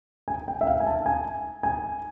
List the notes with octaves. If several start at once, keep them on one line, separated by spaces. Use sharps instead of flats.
G#5
G5
E5
F5
G#5
A5
G#5
G#5